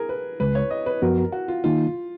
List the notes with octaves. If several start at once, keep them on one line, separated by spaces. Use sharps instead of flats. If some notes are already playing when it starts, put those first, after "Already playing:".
Already playing: G#4 A#4
B4
C#2 C#3 G#3 B4
C#5
D#5
B4
F#2 F3 B3 F#4 A#4
A#4
F#4
F4
D#3 A#3 D#4 F4